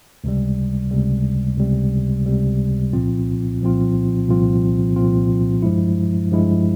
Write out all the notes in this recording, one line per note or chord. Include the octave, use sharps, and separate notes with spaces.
C#2 C3 G3
C#2 C3 G3
C#2 C3 G3
C#2 C3 G3
C2 A#2 F3 C4 F4
C2 A#2 F3 C4 F4
C2 A#2 F3 C4 F4
C2 A#2 F3 C4 F4
G2 F3 G#3 E4
G2 F3 G#3 E4